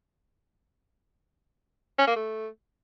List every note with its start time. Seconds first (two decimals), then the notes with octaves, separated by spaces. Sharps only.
1.98 C#4
2.07 A#3
2.16 A3